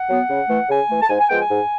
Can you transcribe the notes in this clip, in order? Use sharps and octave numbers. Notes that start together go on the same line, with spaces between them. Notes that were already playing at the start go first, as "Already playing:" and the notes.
Already playing: F#5
F#3 B3
C#3
E3 A3
C#3 G#5
E3 A3
A5
G#2 G#5
G#5
F3 G#3 B3 G5
G#5
G#2